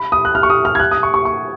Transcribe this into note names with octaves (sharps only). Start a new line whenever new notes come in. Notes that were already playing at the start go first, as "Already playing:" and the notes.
Already playing: B5
D#6
F#6
F6
C#6
D#6
F6
G#6
F#6
D#6
C#6
C#6
C#6